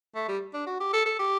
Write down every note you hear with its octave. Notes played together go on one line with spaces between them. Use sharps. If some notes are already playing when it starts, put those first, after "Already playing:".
A3
G3
D4
F#4
G4
A4
A4
G4